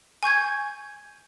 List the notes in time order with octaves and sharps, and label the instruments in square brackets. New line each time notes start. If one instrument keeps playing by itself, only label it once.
[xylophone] G#5 C#6 G6 G#6